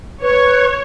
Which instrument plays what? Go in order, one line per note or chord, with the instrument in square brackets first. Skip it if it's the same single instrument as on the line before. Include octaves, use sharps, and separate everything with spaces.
[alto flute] B4 [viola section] C#5